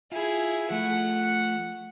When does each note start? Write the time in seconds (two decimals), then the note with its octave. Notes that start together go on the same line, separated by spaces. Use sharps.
0.12 E4 F4 G#4
0.70 F3 A3 F#5